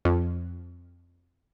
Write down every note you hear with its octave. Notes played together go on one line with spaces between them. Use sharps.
F2